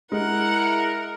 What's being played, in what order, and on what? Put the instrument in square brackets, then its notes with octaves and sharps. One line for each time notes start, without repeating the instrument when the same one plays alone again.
[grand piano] G#3 [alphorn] E4 [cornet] A#4 [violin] F#5